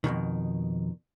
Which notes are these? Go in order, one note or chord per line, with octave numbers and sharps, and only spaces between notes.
F2 G#2 B2 D#3